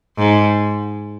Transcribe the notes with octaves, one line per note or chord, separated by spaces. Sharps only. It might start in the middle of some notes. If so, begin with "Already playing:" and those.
G#2